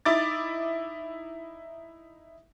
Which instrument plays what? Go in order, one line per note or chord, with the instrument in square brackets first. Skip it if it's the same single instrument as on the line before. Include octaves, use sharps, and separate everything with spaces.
[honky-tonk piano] D#4 E4 D6 A6